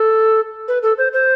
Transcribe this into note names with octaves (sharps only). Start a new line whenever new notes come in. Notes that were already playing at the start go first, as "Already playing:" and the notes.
Already playing: A4
B4
A4
C5
C5